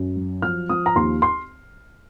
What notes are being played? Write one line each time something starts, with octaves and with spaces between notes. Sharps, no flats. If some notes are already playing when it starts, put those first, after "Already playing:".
Already playing: F#2
F#3
F3 F6
F3 D#6
A#5
D#2 C6
C6